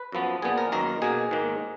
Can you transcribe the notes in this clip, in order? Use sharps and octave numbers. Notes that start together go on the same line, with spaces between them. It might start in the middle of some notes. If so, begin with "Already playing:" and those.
Already playing: B4
F#2 F3 B3
A#2 F3 B3 G#4
A#4
F#2 D#3 A#3 A#4
B2 A#3 G#4
G#2 D#3 A#3